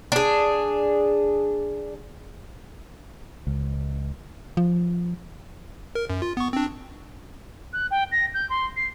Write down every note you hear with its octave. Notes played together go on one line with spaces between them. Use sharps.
D4 G#4
C#2
F3
A#4
F#2
F4
B3 C#6
C4 D4
F#6
G5
A#6
G6
C6
C7